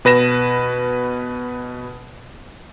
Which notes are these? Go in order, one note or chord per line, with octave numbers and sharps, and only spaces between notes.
B2 B4 A#6 E7